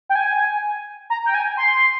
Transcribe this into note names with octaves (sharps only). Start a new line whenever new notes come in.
G5
G#5
A#5
G5
G#5
C6